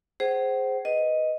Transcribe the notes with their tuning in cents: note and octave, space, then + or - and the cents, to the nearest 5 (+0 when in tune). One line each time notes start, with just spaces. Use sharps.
G#4 +0 C5 +0 F#5 +40
B4 +0 D#5 +5